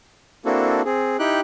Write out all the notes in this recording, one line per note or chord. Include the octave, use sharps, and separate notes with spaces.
A#3 C4 D4 E4 F#4 A4
C4 G#4
D#4 E4 G4 G5 F#6